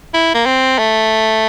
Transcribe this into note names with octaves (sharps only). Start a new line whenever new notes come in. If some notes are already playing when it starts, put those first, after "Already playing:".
E4
A#3
C4
A3